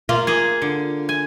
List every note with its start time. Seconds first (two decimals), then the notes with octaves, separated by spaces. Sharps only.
0.09 A#3 F4
0.27 A#3 G#4
0.62 D3
1.09 G#5